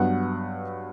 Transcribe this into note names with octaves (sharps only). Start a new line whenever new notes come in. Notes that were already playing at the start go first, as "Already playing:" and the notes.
Already playing: G2 F#3 B3 F#5